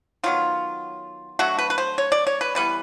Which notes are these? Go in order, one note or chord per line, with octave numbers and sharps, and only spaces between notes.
D#3 F#3 B3 F4
D3 F#3 A3 F#4
B4
B4
C5
C#5
D5
C#5
B4
E3 G3 B3 B4